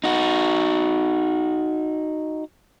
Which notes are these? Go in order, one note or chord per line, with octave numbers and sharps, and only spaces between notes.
D#4 F#4